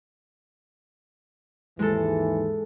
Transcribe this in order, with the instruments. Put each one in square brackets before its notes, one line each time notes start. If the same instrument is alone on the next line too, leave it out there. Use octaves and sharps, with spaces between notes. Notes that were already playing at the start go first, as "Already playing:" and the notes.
[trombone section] D#2 G#2 E3 [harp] G#3 A4